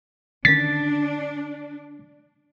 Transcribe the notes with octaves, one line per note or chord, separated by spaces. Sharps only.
D3 D#3 C#4 D4 A6 B6